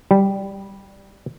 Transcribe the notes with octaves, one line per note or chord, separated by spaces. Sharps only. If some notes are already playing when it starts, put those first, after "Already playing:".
G3